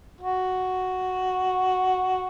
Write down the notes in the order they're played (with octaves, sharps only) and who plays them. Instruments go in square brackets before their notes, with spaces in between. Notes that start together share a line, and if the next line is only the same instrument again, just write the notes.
[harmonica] F#4